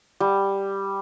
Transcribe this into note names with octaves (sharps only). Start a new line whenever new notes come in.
G3